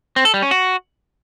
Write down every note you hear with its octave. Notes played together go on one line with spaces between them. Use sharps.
C4
A4
G3
C#4
F#4